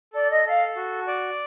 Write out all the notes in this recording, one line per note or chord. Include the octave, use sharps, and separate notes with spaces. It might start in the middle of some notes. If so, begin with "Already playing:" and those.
A4 D5
D#5
A4 F5
F#4
D5